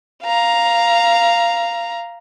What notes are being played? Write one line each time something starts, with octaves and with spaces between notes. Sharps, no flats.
F5 A#5